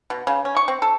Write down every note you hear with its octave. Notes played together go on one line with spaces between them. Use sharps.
B2
C#3
C#4
C#6
C4
A4